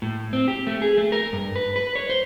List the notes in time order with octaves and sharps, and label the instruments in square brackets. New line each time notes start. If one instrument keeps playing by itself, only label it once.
[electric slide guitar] A2
C4
G4
A3
G#4
A3
A#4
G2
B4
B4
C#5
C5